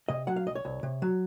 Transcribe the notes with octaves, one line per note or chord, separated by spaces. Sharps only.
C3 D#5
F#3 F#5
F5
C2 D#5
C#5
C2
C3
F#3